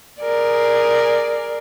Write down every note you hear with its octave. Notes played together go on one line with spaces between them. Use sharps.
G#4 A#4 D5